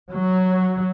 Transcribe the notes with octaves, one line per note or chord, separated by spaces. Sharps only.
F#3